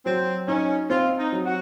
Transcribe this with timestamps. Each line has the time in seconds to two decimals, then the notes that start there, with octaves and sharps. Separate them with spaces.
0.05 F#3 C4
0.47 C#4 D#4
0.90 C4 F4
1.18 D#4
1.33 F#3
1.45 F#4